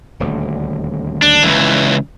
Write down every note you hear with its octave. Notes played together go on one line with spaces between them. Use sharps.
D#1 D2
D4
C#2 E3